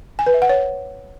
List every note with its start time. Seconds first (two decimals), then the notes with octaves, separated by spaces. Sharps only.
0.19 G#5
0.26 B4
0.34 E5
0.42 F#5
0.49 C#5